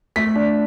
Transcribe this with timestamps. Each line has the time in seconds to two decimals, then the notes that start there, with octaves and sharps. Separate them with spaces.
0.16 A3 B6
0.36 D4